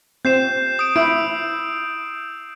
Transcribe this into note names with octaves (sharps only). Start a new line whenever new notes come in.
C4 G6 C7 E7
D#6 D7
E4 E6 D7